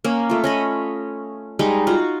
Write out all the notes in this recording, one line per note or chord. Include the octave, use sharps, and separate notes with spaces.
A#3 C#4
A3 F4
C#4 D#5 B5
G3 G#3 D#4
F4 F#4